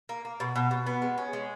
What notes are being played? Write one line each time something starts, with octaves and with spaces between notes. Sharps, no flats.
A#3
A#3
B2
B2
B2
B3
G#3
C#4
G#3